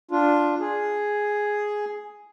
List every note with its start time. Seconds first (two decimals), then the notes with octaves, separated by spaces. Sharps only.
0.11 D4 F4
0.60 G#4